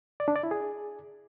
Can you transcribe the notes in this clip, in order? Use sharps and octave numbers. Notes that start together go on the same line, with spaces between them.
D5
D4
D5
E4
G#4